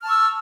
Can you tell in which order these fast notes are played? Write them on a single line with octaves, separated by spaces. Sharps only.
F6 A5 C#6 E6